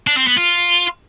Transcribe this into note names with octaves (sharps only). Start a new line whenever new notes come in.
D4
C4
B3
F4